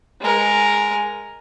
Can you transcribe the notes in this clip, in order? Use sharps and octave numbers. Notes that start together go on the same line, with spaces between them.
G#3 A#4